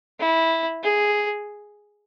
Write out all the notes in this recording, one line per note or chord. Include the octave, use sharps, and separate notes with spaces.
E4
G#4